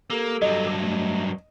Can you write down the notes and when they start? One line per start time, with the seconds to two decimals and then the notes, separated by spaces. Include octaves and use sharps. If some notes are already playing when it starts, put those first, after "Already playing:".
0.10 A#3 G4 A4
0.42 G2 F#3 D#5
0.80 A3